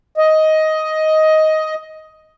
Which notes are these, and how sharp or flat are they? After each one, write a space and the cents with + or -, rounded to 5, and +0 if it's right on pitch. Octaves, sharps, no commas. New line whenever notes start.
D#5 +10